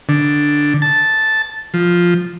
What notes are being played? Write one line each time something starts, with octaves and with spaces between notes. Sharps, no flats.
D3
A5
F3